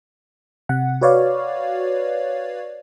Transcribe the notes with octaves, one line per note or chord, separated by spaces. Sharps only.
C3 F#5
F#4 B4 C#5 D5 F5